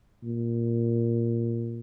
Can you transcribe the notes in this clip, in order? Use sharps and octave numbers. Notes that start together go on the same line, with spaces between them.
A#2